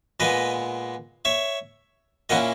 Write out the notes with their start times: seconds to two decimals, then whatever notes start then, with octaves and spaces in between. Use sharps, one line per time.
0.20 A#2 G#3 B3 B4 D#5
1.25 C#5 E5
2.29 A#2 A#3 C#4 E4 D#5 F#5